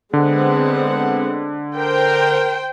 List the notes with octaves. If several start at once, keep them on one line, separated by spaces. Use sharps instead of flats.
D3 G#3 B3 C4 F#5
A#4 C5 G5